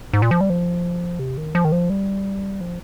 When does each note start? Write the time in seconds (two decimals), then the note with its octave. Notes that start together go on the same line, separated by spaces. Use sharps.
0.13 G#2
0.22 A#2
0.31 F3
0.41 G3
0.50 F3
1.19 C3
1.37 D#3
1.55 F3
1.65 D#3
1.72 F3
1.90 G3
2.61 F3